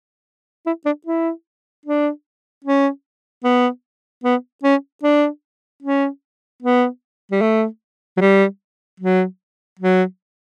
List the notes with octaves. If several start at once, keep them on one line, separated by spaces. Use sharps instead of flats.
E4
D4
E4
D4
C#4
B3
B3
C#4
D4
C#4
B3
G3
A3
F#3
G3
F#3
F#3